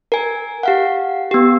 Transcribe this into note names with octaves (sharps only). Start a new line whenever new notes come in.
A#4 G#5
G4 F5 F#5
B3 G4